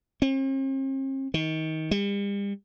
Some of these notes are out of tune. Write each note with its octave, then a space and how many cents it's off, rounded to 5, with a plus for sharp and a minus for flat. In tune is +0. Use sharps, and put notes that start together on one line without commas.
C4 +45
D#3 +25
G3 +40